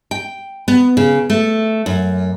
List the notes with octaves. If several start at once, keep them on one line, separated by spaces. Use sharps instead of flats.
G5
B3
C#3
A3
F#2